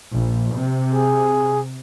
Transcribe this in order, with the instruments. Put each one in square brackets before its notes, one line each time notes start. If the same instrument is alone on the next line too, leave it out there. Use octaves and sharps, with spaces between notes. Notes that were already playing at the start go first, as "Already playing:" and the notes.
[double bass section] A#1
C3
[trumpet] G#4